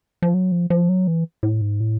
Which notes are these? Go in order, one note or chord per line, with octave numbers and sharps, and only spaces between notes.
F3
F#3
F3
F3
F#3
E3
A2
G#2
A2